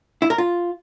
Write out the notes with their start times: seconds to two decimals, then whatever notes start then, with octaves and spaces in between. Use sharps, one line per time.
0.22 E4
0.30 A#4
0.38 F4